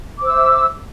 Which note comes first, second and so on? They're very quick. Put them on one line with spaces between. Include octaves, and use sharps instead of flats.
D6 C5 E6 E5